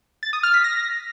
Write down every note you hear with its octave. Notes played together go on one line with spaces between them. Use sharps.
A6
D#6
F6
B6
A#6